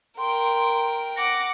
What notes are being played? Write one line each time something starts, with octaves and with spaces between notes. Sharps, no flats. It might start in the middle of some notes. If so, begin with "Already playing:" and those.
A#4 G5 C6
F#5 D6 A#6